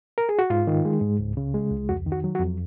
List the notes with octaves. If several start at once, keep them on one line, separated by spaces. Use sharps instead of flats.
A#4
G#4
F#4
G#2 F4
D#3
G#3
G#2
C#2
C#3
G#3
C#2
F2 F#4
D#3
F#4
F#3
F#4
F2